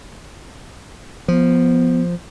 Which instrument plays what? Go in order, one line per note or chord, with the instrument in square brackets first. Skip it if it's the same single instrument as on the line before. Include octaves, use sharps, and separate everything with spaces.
[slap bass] F3 [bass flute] B3